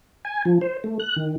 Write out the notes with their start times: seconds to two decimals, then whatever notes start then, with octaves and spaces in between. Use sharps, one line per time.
0.25 G#5
0.45 F3
0.61 C5
0.84 A3
1.00 F#6
1.16 D#3